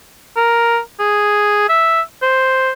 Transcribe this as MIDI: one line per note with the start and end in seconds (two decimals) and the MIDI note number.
0.37 0.79 70
1.00 1.67 68
1.69 2.01 76
2.22 2.72 72